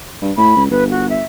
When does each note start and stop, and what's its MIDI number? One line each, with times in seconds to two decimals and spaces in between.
0.22 0.32 43
0.37 0.55 45
0.37 0.63 83
0.56 0.66 37
0.70 1.22 31
0.70 0.84 71
0.91 1.08 66
1.09 1.23 76